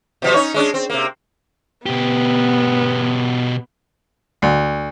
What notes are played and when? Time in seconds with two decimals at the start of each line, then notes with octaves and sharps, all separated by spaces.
0.22 B2 F3 G3
0.34 C#4 D#4 C#5
0.54 G#3 C#4 D4
0.74 C4
0.90 C3 A#3
1.86 B2 B3 G4
4.42 D2